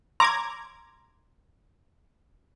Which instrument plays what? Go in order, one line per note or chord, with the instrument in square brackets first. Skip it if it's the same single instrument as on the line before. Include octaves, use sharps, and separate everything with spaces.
[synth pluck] A#5 D6 G#6 [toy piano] C6